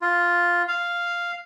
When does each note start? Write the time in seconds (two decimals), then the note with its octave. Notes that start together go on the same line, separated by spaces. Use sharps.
0.02 F4
0.68 F5